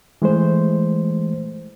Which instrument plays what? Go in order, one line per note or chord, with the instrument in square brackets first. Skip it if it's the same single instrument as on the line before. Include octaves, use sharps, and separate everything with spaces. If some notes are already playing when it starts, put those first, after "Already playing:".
[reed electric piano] E3 G#3 A3 C5